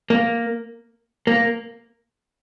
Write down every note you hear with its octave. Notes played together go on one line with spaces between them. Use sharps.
A#3
A#3